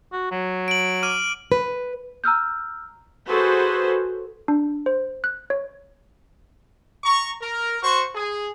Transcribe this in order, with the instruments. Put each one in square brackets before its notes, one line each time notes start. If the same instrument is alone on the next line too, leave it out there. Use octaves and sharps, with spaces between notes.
[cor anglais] F#4
F#3
[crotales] D7 F#7
D6 F6 D#7
[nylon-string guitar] B4
[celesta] A#5 E6 F6 G6
[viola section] F#4 G#4 A4 B4 C5
[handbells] D4
C5
F#6
C#5
[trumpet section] A#5 C#6
A#4
F#4 C5 C#6
G#4